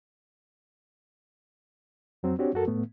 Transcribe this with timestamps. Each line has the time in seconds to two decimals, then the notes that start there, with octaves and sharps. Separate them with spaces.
2.23 F2 F#3 C4
2.39 C4 D4 F#4 G4 C#5
2.54 F#2 F#4 A4 A#4
2.68 A2 A3 B3